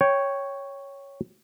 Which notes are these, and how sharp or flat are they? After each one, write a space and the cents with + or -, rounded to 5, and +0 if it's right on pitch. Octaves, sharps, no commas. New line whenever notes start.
C#5 +0 G5 +0